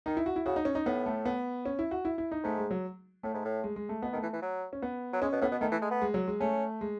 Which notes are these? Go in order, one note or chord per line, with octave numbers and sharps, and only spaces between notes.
D#3 D#4
E4
F#4
E4
C#3 F#4
D#4
C#4
D#4
A2 B3
A3
B3
C#4
E4
F#4
E4
E4
D#4
G#2 A3
G#3
F#3
A2 A3
G#2
A2
G#3
G#3
A3
B2 B3
D#3
A3
E3
E3
F#3
C#4
B3
F#3
G#3 C#4
B2
A2 B3
B2
D#3 A3
E3
G#3
B3
G#3
F#3
G#3
A3 C#4
G#3